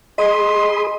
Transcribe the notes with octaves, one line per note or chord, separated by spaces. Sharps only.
G#4 D#5 B5 C6 D#6